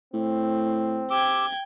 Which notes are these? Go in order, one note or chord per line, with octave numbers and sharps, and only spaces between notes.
A2 C4
G4 G5 D6 E6 G#6